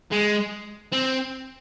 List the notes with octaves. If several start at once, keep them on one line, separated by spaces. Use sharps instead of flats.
G#3
C4